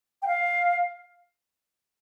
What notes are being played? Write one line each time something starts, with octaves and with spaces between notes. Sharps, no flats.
G5
F5